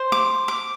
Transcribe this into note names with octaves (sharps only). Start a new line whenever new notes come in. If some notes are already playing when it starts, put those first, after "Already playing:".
Already playing: C5
D6
D6